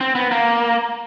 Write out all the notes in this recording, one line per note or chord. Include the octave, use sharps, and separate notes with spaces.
C4
B3
A#3